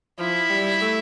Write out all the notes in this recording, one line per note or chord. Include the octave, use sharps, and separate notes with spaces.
F3 E4
G3
A3